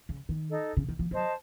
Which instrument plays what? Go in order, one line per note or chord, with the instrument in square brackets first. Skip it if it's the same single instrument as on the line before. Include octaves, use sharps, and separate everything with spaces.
[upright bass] C#3
D#3
[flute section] D#4 A4 D#5
[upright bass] C#3
D#3
F3
[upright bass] F#3 [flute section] C5 D#5 A5